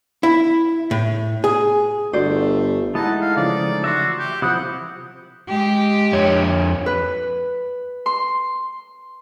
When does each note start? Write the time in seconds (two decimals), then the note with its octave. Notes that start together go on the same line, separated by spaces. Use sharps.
0.23 E4
0.91 A2
1.44 G#4
2.13 G1 A3 F#4 C5 D5
2.95 G#3 A3 D#4 E4 F#5 A5
3.21 F5
3.37 C#3 E3 F3 D5
3.84 F#4 E5 C6
4.19 G4
4.42 C3 F3 E4 F#5 D#6 G6
5.50 G#3 G4
6.13 F2 C#5
6.86 B4
8.06 C6